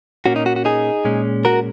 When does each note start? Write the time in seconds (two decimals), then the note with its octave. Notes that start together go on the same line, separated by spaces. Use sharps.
0.26 A#2 A#3 C#4 F#4
0.36 D#4
0.46 F#4
0.56 F#4
0.65 D#4 G#4
1.05 A#2 G#3 C#4
1.45 F#4 A#4